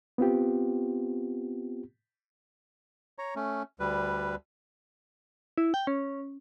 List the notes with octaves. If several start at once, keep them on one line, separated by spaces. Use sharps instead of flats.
B3 C4 F4 G4
C#5 A#5
A3 C#4
D2 G3 B4
E4
G5
C#4